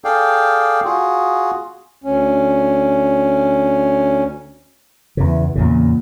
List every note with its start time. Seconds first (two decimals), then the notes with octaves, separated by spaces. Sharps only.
0.04 G#4 A4 D5 F5 G5
0.85 F4 F#4 G#4
2.04 D2 C#4
5.17 E2 C#3 E3
5.55 E2 A#2 C#3 A#3